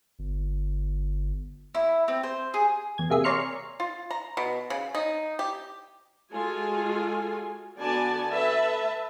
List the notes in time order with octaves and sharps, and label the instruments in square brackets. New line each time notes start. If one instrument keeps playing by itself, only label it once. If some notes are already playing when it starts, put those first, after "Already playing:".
[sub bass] G1
[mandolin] E4
C4
C5
G#4
[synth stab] E2 G#6
C3 A#3 G#4 E5
C#5 D5 A#5 C6 F6 C#7
[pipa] F4
A#5
B2
C#3
D#4
G4
[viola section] G#3 F4 F#4 A4 G#5
D3 B3 F#4 D5 G#5 A5
A4 B4 E5 A5